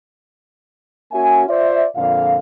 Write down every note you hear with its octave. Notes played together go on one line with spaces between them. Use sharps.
A#3 C#4 F#4 E5 G#5
F4 C5 D5 E5
F2 A#2 D3 F5